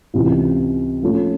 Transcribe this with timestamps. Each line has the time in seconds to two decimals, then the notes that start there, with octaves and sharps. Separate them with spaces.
0.14 C#2 C3 E3
1.02 A#2 F3 A3 C#4 F4